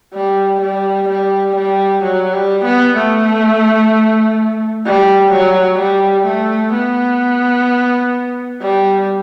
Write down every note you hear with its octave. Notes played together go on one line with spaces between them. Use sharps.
G3
G3
G3
G3
F#3
G3
B3
A3
G3
F#3
G3
A3
B3
G3